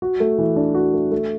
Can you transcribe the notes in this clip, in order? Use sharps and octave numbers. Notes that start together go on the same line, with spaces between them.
F#4
A3
E3
D4
F#4
A3
A3